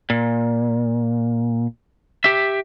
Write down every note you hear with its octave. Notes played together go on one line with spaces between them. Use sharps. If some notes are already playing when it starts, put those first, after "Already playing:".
A#2
G4 E5